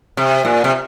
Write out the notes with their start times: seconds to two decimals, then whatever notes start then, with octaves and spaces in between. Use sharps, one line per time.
0.17 C3
0.45 A#2
0.64 C3